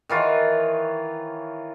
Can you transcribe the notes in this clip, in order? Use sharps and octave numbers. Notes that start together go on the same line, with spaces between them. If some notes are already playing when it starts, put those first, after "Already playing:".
D#3 E3 F4 C#5